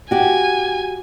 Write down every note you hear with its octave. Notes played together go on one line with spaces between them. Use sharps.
F#4 G4 G#5